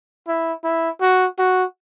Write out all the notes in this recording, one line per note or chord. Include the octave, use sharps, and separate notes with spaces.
E4
E4
F#4
F#4